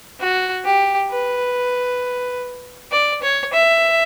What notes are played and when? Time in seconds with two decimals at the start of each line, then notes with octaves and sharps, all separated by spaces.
0.20 F#4
0.65 G4
1.10 B4
2.92 D5
3.22 C#5
3.53 E5